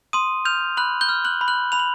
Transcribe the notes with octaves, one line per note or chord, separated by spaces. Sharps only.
C6 D#6 D#7
F6 G6 F7
B5 F#6 F#7
G6 G7
F6
F#6 F#7
B5
F#6 F#7
B5 F7
F#7